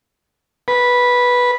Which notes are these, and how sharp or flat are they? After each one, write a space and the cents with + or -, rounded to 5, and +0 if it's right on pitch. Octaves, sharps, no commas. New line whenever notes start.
B4 -10